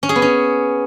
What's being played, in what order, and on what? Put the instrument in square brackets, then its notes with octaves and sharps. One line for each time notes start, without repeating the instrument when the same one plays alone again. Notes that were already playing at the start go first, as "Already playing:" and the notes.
[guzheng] C#4
G#4
B3
C#4